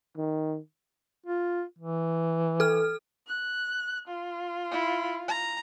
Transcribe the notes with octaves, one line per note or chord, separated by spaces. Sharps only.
D#3
F4
E3
A4 F6
F#6
F4
E4
A#5